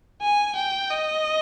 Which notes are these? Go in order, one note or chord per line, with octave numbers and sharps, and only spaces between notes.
G#5
G5
D#5